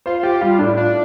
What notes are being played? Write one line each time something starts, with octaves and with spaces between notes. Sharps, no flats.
F4 C5
F4 G4
G3 F4
A2 D4
D4 F4